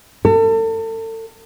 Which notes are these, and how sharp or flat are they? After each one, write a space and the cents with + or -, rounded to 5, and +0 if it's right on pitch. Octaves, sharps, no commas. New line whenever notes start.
A4 +35